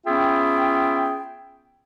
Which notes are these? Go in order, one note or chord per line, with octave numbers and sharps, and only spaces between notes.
B3 C#4 F4 G#4 E5 G5